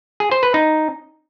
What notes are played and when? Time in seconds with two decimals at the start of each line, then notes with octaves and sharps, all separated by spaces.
0.20 G#4
0.31 C5
0.43 B4
0.54 D#4